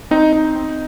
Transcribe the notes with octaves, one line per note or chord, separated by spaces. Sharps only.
C4 D#4
D#4
C4